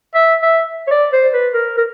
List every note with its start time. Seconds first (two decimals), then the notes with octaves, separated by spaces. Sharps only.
0.15 E5
0.42 E5
0.87 C#5
0.91 D5
1.13 C5
1.33 B4
1.54 A#4
1.77 A#4